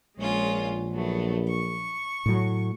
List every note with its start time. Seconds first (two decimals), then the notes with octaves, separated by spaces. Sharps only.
0.19 A#1 G#3 C#4 F4
0.93 F#3 A3 B3
1.47 C#6
2.26 A2 F#3